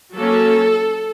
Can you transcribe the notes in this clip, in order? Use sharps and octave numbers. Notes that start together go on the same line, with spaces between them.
F#3 A#3 C#4 A4